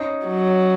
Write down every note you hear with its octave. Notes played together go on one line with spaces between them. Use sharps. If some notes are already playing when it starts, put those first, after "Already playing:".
Already playing: C#4 D#4
F#3